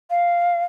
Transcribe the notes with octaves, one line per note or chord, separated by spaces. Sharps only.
F5